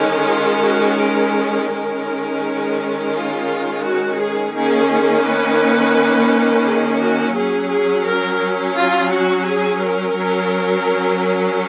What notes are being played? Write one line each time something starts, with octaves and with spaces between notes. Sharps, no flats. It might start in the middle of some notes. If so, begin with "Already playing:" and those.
Already playing: D#3 G#3 C#4 D#4
F4
F#4
A#4
A#4
D#3 G#3 C#4
F4
F#4
G#4
D#3 A#3 C#4 G#4
G#4
B4
G#4
F#4
F#3 C#4 G#4
G#4
A#4
F4
F#4
G#4
A#4
F#3 C#4